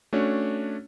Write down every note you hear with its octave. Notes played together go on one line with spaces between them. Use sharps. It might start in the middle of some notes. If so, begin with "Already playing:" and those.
A3 C#4 D4 F#4 C#5